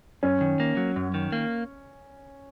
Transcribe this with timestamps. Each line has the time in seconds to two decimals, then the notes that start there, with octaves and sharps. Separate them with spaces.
0.23 F#2 C#4
0.41 D#3
0.60 A#3
0.77 F#3
0.96 F#2
1.14 D#3
1.32 A#3